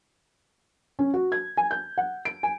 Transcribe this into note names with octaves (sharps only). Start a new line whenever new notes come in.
C#4
F#4
G#6
G#5
G6
F#5
D7
G#5